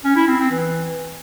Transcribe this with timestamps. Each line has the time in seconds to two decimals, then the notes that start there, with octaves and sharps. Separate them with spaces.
0.04 C#4
0.16 E4
0.28 C4
0.39 C4
0.51 E3